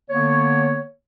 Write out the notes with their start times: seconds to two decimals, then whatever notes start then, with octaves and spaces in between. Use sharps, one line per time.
0.09 D3 A#3 B3 C#5